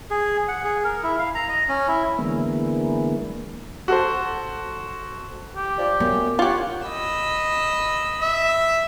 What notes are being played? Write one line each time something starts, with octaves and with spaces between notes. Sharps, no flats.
G#4
F#5
G#4
A#4
E4
F5
A#5
D#5
C#4
E4
D3 E3 G#3 A#3 B3
F#4 A4 C5
G4
F3 D4 D5
F#2 B3
F4 G4 C#5 F#5
D#5 B5 E6
E5